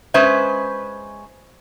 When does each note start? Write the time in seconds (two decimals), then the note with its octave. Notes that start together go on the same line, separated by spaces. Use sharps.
0.14 G#3 C#4 B4 C5 E5